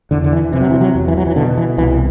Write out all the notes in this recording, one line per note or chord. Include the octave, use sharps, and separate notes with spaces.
E2 D3
D3
E3
C3 E3
F#3
E3
F#3
E2
E3
F#3
E3
B2 D3
E3
C2 E3